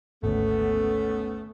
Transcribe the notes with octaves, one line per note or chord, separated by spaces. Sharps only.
G#1 D2 A3 B3 C#4